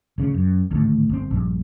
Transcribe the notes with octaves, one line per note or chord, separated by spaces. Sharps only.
D1 C#3
F#2
G#1 D2 A2
G1 C4
A#1 G2